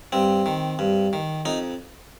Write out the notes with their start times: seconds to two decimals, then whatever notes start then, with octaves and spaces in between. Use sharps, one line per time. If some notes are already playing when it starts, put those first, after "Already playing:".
0.12 G2 C4
0.46 D#3
0.79 G2
1.13 D#3
1.45 F2 D#4